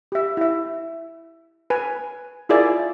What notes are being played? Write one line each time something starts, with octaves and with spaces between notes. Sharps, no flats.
G4 E5
E4 E5
B4 G#5
E4 F4 G#4 A#4 D5 E5